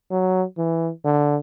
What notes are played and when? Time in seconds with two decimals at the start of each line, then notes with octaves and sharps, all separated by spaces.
0.11 F#3
0.58 E3
1.05 D3